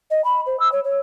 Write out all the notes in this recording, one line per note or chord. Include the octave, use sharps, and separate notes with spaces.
D#5
B5
C5
E6
C#5
C#5